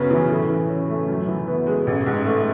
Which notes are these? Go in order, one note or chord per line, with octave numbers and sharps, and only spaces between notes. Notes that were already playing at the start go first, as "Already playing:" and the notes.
Already playing: F#2 C#3 B3
E3
A2
E3
C#4
A3
F#2
E3
B3
G#3
A1
G#2
A3